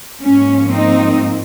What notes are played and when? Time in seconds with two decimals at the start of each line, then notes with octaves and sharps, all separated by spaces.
0.22 G#2 F3 A#3 C#4
0.72 C4 D#4